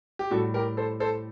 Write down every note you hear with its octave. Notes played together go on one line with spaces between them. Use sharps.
G4
A2 G3 F#4 A4
G4 A#4
A4 C5
A4 C5